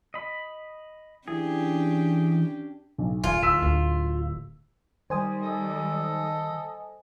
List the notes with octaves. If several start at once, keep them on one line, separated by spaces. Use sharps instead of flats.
D#5 B5
E3 C#4 D4 G4 G#4
B1
D#1 F4 G#5
D1 E6 B6 E7
D2
D#3 G3 C5 G#5 D#6
A4 D#5